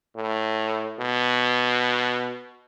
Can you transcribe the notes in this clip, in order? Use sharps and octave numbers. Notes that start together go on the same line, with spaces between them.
A2
B2